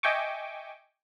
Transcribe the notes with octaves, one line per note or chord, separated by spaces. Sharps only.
D#5 E5 G5 G#5 C#6 D6